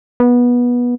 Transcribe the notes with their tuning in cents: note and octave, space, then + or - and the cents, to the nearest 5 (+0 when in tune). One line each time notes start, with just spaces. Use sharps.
B3 -20